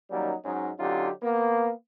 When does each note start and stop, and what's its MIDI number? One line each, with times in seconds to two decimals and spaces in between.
0.11 0.33 51
0.11 0.33 54
0.11 0.33 55
0.11 0.33 58
0.11 0.33 61
0.11 0.33 63
0.45 0.70 44
0.45 0.70 54
0.45 0.70 61
0.45 0.70 63
0.79 1.10 50
0.79 1.10 54
0.79 1.10 61
0.79 1.10 63
0.79 1.10 65
0.79 1.10 67
1.22 1.70 58
1.22 1.70 59